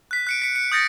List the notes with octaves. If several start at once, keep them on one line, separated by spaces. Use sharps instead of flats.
F#6 B6
F#6 C#7 D7
B6 C#7
C#7
D#6 G6 A6 A#6 C#7